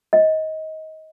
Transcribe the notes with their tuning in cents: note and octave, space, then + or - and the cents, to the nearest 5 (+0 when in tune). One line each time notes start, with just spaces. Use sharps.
D#5 +20